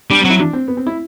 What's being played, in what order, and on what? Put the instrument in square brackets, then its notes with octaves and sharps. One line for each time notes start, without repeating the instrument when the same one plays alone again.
[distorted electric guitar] G3 [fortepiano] D4
[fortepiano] C4
[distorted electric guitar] F#3
[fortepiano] E4
D4
C4
B3
C4
E4